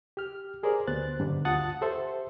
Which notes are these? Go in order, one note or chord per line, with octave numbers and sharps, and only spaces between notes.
G4 F6
G4 G#4 A#4 C5 D5
D2 B3 C5 F#6 A6
G2 D3 G3 D4
D2 F4 F#5 A5 D#6 A6
G4 A4 C5 E5